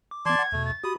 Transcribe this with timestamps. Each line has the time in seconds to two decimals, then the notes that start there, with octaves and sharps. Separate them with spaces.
0.11 D6
0.26 E3 B3 D5 A5 C6 G#6
0.39 F#5
0.52 E2 B2 A3
0.65 A6
0.84 F#4 G4 B5 D#6